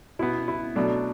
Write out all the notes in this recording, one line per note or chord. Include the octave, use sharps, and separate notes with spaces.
B2 B3 E4
E4
B2 F#3 A3 D4